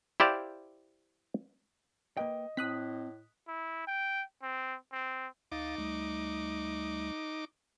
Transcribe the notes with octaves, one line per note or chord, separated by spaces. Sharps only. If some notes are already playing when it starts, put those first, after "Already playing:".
E4 G4 C5 D5 F5
A#3 B4 D#5 G5
A2 C4 A5 D#6 F#6 B6
E4
G5
C4
C4
D2 D#4 F5 D6 A6
D2 G3 A3